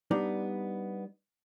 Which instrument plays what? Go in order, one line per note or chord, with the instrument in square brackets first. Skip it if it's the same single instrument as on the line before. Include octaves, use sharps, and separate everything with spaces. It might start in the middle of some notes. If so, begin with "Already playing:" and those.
[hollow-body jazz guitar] G3 B3 D4 D#4